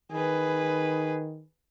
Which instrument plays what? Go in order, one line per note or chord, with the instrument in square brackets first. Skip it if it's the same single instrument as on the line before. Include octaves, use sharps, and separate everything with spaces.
[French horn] D#3 [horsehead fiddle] G#4 B4